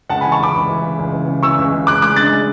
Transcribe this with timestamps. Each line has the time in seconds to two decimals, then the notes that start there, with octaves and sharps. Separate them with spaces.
0.10 C#2 F#5 A5
0.21 E3 G#5 B5
0.32 A5 C#6
0.40 C#2 B5 D6
0.55 C#2
0.69 E3
0.84 C#3
0.99 C#2
1.14 E3
1.28 C#3
1.43 E3 C#6 E6
1.58 C#2
1.73 C#3
1.87 C#2 D6 F#6
2.02 G#3 D6 F#6
2.16 D4 F#6 A6
2.31 G#3